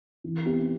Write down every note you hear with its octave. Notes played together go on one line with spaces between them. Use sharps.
E3
B3 E4 G4